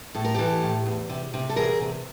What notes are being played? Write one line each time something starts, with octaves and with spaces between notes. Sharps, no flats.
A2 A4
A#4
E3 G4 A4
A2
E2
C3
C3
A4
E2 G#4 A#4
C3